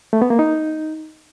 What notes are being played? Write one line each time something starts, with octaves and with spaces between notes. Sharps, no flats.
A3
B3
A#3
D#4